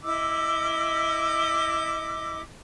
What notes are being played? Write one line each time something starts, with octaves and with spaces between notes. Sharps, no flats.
E4 D#5 D6 E6